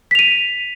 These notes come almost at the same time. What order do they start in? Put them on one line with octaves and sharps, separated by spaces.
B6 F7 D#7